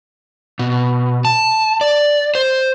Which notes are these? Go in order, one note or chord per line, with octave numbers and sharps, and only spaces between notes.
B2
A5
D5
C5